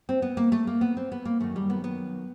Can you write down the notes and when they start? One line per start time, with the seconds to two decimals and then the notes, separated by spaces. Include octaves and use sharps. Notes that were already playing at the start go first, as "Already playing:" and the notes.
0.09 C4
0.22 B3
0.37 A#3
0.52 A3
0.67 A#3
0.81 B3
0.97 C4
1.12 B3
1.25 A#3
1.40 F#2 D#3 F#3 A3
1.56 G3
1.70 B3
1.84 B3